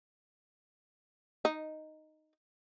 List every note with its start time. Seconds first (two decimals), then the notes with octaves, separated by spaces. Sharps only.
1.45 D#4